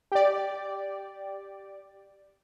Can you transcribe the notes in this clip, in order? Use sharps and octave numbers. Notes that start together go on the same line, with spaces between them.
G4 D5